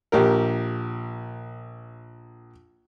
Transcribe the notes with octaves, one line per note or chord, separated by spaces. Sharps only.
A#1 G4 A#4